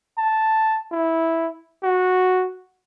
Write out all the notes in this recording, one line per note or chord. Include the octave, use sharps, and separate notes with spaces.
A5
E4
F#4